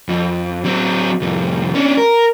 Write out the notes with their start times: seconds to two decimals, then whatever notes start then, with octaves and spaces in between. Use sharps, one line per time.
0.09 F2
0.65 F#3 C4
1.22 C2 F2
1.75 C#4 D4
1.97 A#4